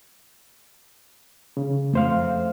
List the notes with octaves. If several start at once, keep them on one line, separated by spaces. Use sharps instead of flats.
C#3
F2 A3 C5 F5